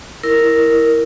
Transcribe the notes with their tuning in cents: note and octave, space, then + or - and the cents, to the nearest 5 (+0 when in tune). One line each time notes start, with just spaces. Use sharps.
E4 +0 A#4 +0